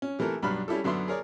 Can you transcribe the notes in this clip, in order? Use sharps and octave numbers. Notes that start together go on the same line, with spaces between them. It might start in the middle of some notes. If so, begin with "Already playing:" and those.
C#4
C3 E3 A3 A4 A#4
B1 G2 D4 B5 F6
G3 C#4 E4 G4 A4
F#2 D3 B3 E5 C6
G#4 A#4 C#5 D5